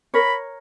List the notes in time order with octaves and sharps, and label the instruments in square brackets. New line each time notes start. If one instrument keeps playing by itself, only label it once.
[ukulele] A#4 C#5 [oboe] B5